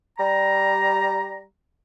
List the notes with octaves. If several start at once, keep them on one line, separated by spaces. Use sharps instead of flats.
G3 A#5